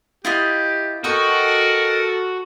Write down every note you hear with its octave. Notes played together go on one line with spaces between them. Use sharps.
E4 F4 G4 D#5
F#4 A4 A#4 D#5 G5 C#6